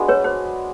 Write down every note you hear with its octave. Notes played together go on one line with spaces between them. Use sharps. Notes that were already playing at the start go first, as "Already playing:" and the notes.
Already playing: G#3 B3 D4 F#4
B4 C#5
C5